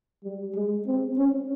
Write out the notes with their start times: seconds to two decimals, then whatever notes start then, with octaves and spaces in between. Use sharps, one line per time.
0.24 G3
0.55 G#3
0.87 C4
1.18 C#4